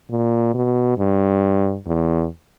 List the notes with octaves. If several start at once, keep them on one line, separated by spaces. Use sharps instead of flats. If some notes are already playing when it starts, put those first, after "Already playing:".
A#2
B2
G2
E2